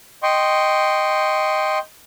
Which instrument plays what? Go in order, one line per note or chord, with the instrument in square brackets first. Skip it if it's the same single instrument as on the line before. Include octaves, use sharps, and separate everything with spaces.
[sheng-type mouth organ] D#5 G5 C6 C#6